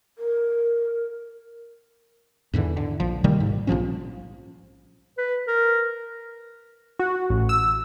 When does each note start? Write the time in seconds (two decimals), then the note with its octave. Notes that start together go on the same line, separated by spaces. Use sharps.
0.18 A#4
2.53 E2 G#2 D3 E3
2.77 D3
3.00 A#1 F3
3.24 C3 D#3 G3 A#3
3.40 G#2
3.67 A#1 F2 F3 C#4
5.18 B4
5.47 A#4
6.99 F#4
7.30 A1
7.49 E6